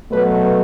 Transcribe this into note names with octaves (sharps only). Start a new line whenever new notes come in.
B2 F#3 A3 B4